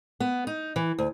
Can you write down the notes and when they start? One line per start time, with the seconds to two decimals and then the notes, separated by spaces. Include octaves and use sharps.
0.20 B3
0.47 D#4
0.76 E3
0.99 D2